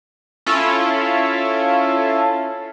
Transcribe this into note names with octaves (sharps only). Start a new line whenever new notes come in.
C#4 E4 F4 A4